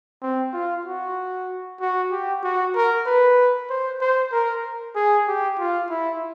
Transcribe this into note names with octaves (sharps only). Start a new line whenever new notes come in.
C4
F4
F#4
F#4
G4
F#4
A#4
B4
C5
C5
A#4
G#4
G4
F4
E4